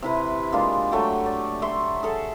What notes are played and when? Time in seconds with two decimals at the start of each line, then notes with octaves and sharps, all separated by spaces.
0.02 C3 E4 B4
0.52 G#3 A#3 D4 F4
0.92 F#3 A3 G4 G5
1.26 D5
1.62 E5 C6 C#6
2.03 G#4 A4 A5